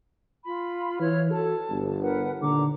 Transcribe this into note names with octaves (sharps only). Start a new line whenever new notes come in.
F4 B5
E3 C#5 F6
F#4 A4 A5
G1
A#4 B4 F#5
D#2 A#2 D3 A#5 D6